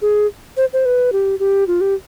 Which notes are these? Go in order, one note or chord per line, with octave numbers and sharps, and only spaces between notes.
G#4
C5
C5
B4
G4
G4
F4
G4